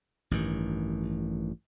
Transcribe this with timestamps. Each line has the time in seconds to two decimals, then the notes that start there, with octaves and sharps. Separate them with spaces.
0.31 A1 G2 D#3